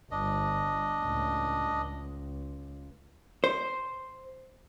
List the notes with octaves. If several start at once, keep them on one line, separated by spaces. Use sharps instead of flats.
G1 D4 D#5
C#2 A2
C#2
C5